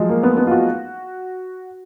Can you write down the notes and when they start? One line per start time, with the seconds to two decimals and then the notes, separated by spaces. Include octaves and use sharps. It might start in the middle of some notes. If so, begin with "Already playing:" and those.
Already playing: F3 F#3 G#3
0.09 A#3
0.23 B3
0.37 B3
0.47 F4
0.51 F#4